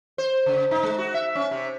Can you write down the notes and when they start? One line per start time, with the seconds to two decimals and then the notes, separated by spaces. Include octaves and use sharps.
0.18 C5
0.46 C#3
0.71 D#4
0.83 G#3
0.98 F#4
1.14 E5
1.35 C#4
1.51 C3